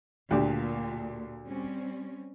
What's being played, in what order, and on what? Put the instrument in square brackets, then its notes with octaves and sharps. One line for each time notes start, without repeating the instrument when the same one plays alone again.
[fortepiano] D2 D4 G4 [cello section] A#2
[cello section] G3 C4 C#4